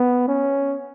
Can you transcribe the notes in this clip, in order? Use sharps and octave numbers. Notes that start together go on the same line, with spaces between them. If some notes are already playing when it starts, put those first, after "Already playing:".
Already playing: B3
C#4